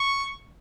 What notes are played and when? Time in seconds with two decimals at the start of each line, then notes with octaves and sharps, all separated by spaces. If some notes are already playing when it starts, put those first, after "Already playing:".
Already playing: C#6